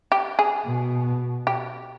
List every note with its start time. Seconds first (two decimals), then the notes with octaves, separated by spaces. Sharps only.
0.12 G4
0.39 G#4
0.66 B2
1.47 G4